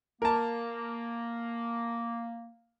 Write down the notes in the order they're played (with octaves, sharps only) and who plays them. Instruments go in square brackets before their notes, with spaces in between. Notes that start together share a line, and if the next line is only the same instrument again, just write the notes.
[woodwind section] A#3 [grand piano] A#4 A5